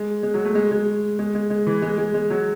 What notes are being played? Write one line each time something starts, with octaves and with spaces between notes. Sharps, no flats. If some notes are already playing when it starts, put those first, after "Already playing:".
Already playing: G#3
G#3
F#3
A3
G#3
G#3
G#3
G#3
G#3
E3
G#3
G#3
G#3
F#3